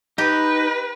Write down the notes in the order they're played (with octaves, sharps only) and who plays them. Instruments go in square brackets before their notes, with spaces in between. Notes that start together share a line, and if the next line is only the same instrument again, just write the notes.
[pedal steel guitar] D#4 [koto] G4 [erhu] B4